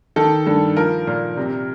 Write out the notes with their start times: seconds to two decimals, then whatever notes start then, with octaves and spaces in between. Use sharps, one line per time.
0.16 D#3 A4
0.46 G2 A4
0.77 F3 A#4
1.07 A#2 A#4
1.37 C3